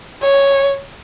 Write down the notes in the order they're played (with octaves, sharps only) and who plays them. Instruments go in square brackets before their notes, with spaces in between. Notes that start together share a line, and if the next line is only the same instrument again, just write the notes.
[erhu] C#5